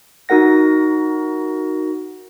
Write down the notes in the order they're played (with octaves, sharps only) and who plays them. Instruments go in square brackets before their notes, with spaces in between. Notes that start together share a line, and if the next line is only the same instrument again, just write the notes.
[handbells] D#4 F#4 A#4 F#5 A#6